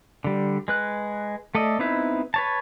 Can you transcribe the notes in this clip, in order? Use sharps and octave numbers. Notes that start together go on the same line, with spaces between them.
D3 G3
G#3 B4 F#6
A3 A4 D5 D#5
B3 C4 D#4 E4 B4
B4 C#5 A5